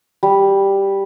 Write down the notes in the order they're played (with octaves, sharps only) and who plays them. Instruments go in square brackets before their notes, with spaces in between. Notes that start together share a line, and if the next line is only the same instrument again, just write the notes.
[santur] G3